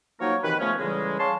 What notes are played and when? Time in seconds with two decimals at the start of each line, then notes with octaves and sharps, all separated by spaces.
0.21 F3 F#3 A#3 D#4 A#4 C#5
0.44 C3 D#3 E3 B4
0.60 C#3 F3 A3 B3 C#4
0.79 A2 C#3 E3 G3 G#3
1.19 G#4 C#5 F5 A5 C6